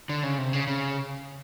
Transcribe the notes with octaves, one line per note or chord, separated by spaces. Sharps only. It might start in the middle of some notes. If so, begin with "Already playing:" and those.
D3
C#3
C3
C#3
C#3